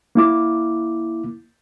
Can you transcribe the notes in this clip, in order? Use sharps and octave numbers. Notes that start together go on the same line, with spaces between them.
A#3 E4 D6